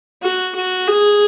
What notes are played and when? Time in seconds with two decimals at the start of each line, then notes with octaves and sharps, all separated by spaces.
0.22 F#4
0.55 F#4
0.88 G#4